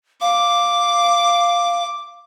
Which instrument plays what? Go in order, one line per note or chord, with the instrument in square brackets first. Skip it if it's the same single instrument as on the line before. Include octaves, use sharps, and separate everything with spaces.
[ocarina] F5 [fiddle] D6